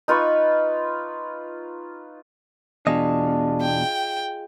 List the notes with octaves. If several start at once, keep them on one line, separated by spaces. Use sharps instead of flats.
D#4 F4 B4 C#6
E2 B2 D4 F4 G#4 D#5
G5